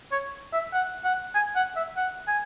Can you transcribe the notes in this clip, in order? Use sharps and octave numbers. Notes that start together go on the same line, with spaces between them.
C#5
E5
F#5
F#5
G#5
F#5
E5
F#5
G#5